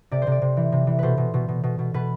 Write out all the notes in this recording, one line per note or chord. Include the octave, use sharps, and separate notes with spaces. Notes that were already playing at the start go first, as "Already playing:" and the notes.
C3 D5
C5
C3 D5
C3
E3
C3
E3
B2 B4 C5
B2
B2
B2
B2
B2
B2 B4